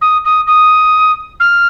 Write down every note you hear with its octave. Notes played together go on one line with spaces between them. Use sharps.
D#6
D#6
D#6
F6